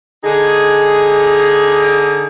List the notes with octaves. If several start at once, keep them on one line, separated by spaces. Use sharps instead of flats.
D3 D#4 G#4